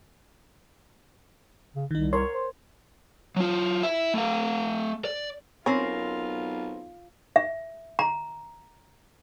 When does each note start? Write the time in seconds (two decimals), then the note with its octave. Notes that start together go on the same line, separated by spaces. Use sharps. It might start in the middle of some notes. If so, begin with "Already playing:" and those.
1.76 C#3
1.91 C2 D#3 D#4
2.13 A#4 C#5 C6
2.34 C5
3.36 F#3 F4
3.83 E4 E5
4.14 A3 F5
5.05 D5
5.66 B1 C4 C#4 F4 A#4
7.36 E5
7.99 A#5